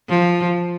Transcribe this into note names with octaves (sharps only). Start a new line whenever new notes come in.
F3